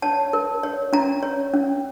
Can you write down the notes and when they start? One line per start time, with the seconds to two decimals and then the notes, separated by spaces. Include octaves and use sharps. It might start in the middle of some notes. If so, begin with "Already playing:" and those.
0.02 C#5 A5
0.33 A#4
0.63 C#5
0.93 C#4 A#5
1.23 C#5
1.54 C#4